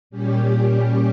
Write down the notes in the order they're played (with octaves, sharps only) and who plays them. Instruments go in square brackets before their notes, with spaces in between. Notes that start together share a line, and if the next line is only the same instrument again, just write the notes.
[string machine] A#2 G3 C#4 G4